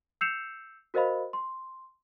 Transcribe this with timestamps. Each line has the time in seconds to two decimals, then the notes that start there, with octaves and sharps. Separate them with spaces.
0.21 E6 G6 C7 C#7 E7 F7
0.94 F#4 A#4 C5 D#5 F5 B5
1.33 C6